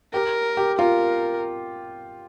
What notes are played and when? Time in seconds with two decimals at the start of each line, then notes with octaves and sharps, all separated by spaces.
0.13 G4 A#4
0.57 G4
0.78 F4 A#4